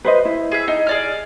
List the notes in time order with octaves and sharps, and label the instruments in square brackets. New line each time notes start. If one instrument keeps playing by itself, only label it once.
[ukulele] B4 C5 D#5
E4
[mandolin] G#4 E5
D#4
G#4 D5 F6